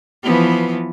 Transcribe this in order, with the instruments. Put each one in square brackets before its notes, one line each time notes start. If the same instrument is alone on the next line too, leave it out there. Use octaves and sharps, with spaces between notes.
[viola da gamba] E3 F3 B3